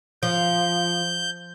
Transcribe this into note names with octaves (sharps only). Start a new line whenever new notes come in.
F3 G6